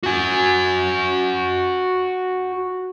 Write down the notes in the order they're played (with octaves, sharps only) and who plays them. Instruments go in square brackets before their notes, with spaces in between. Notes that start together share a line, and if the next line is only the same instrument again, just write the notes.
[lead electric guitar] F#4 G#5